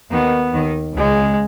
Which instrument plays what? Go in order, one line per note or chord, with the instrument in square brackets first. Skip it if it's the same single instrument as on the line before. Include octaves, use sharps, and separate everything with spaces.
[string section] D#2 D#3 [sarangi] B3
[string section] D#2 D#3
[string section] C#2 C#3 [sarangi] G#3